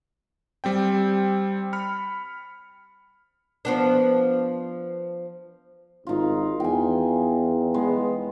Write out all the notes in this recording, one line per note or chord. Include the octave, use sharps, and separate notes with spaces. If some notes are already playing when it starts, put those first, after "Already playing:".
G3 C4 G5
B5 F6 C#7
F3 B3 D4
G#1 D#4 F4
E2 G5 G#5
G#3 B3